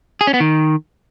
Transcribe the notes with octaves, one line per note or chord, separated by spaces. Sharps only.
G#4
C#4
B3
D#3